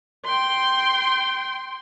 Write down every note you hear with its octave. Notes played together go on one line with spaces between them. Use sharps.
G5 C6